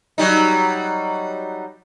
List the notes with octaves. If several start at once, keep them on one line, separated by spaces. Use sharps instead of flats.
F#3 G3 D#4